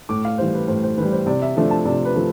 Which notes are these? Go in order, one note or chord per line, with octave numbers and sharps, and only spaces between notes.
A2 D6
F5
E3 G3 C5
B4
A2 C5
C5
E3 G3 B4
C5
C3 D5
E5
F3 A3 D4 E5
A5
C3 D5
B4
F3 A3